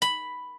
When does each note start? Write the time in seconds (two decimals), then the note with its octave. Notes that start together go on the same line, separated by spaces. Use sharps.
0.02 B5